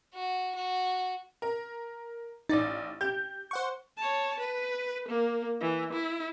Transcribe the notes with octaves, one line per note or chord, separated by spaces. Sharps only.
F#4
F#4
A#4
A1 D#4 D5 A6
G4 G6
C5 F#5 C#6
C#5 A5
B4
A#3
E3
E4